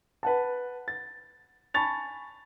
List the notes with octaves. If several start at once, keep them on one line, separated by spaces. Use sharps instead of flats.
B4 F#5 A5
A6
G#5 A5 B5 C#6 A6 F7